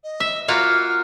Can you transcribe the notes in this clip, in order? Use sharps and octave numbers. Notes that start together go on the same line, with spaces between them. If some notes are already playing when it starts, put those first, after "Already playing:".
D#5
E5
A#3 F4 F#4 F6